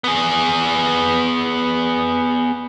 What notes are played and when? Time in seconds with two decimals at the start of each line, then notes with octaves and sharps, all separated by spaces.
0.04 B3 G#4